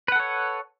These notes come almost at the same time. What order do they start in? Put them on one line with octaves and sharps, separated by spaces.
B4 F#5 A4 C#5